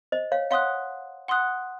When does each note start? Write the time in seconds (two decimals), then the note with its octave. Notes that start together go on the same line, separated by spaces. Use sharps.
0.12 C5 D#5
0.32 C#5 F5
0.51 C#5 F5 F#5 C6 D#6 F#6
1.28 F#5 C6 D#6 F#6